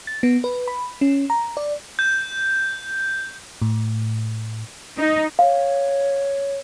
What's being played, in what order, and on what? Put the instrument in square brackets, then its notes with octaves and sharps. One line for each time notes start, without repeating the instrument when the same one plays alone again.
[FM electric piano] A6
B3
B4
B5
C#4
A#5
D5
[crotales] G6
[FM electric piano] A2
[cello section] D#4
[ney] C#5 [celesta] F5